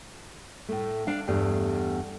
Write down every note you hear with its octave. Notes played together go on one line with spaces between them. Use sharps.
A2 A3
D4 F5
E2 G2 G3 A3